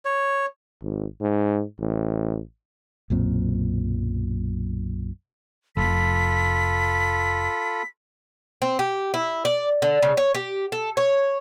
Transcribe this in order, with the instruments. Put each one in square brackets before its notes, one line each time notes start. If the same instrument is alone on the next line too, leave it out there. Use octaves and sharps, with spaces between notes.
[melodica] C#5
[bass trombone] G#1
G#2
A1
[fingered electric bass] B1 F#2 A#2 C4
[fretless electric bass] F1 [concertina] F4 A4 B5 [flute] B6
[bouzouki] C4
G4
E4
D5
D3
C#3
C#5
G4
A4
C#5